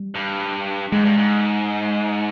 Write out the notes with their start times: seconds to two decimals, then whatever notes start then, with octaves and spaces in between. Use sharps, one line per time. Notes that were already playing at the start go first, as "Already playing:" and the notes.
Already playing: G3
0.15 G2
0.92 G#2 G#3
1.05 G2
1.17 G#2